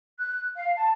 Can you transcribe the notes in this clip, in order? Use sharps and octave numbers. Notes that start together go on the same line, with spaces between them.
F#6
F5
A5